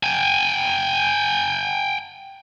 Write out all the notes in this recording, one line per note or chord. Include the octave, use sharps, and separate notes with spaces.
G5 G#5